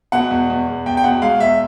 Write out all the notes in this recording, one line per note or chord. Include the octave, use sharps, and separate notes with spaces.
B2 F#5
E2
E2
E2
E2 G5
G5
B2 F#5
G#3 F5
E2 E5